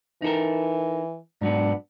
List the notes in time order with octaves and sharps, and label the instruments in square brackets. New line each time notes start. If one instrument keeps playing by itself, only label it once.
[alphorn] E3 [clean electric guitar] D#4 A4 A#4
[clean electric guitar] G#2 F#3 B3 [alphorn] D4